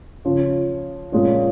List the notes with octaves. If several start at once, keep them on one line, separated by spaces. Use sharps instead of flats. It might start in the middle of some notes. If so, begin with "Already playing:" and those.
C#3 F3 C#4 F4
A#2 F3 G#3 C#4 F4